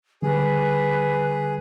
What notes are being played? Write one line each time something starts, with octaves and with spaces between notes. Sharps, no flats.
D3 G3 G#4 B4